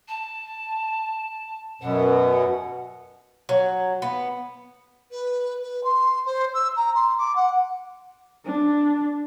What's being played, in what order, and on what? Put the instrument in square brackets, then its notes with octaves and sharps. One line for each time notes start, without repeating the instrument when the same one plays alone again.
[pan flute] A5
[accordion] F#2 B2 [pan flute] F#5
[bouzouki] F#3
B3
[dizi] B4
B4
C6
C5
E6
A#5
C6
D6
F#5
[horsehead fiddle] D4